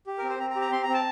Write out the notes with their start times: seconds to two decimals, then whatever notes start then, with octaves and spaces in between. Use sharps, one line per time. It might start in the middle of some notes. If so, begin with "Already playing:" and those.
0.07 G4
0.18 C4 A#4
0.29 C5
0.39 C4 A#5
0.50 A#5
0.55 G4
0.61 A#5
0.72 C4 C6
0.83 A#5
0.89 C4
0.94 A5